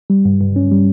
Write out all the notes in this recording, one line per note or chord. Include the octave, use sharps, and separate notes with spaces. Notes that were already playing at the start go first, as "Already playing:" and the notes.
G3
G2
G2
C#4
G3